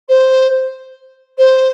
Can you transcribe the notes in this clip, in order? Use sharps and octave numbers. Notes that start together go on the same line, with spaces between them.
C5
C5